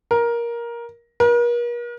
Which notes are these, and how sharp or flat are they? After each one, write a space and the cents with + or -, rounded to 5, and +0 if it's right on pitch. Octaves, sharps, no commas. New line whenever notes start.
A#4 +15
A#4 +45